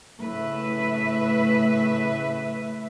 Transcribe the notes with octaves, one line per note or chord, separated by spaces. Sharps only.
A2 C#3 B4 E5